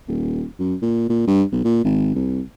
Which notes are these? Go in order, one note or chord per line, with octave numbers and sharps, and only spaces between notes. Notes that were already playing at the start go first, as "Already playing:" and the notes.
D#1
F#2
A#2
A#2
G2
B1
A#2
G#1
C2